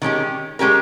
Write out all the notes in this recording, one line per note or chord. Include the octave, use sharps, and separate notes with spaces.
D#3 G#3 C#4 G4
G#3 C#4 G4 A#4